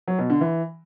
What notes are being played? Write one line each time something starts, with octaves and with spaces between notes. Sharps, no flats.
F#3
B2
D3
E3